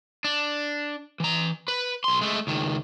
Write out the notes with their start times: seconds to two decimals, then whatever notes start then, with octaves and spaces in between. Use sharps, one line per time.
0.24 D4
1.20 E3 A#5
1.68 B4
2.04 B1 C6
2.21 G#3 A3
2.47 C#2 D#3